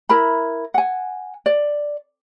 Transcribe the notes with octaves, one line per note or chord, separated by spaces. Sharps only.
E4 A#4 A#5 B5
F#5 G#5
D5